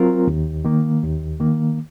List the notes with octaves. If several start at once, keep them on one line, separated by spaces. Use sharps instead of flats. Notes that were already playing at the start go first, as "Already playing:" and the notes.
Already playing: F#3 C4 F4 A#4
D#2
D#3 A#3
D#2
D#3 A#3